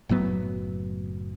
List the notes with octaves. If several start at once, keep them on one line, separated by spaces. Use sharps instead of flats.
F#1 A2 F#3 B3